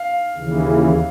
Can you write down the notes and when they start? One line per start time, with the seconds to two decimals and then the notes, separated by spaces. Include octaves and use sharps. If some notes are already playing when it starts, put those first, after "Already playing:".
Already playing: F5
0.36 D#2 C#3 E3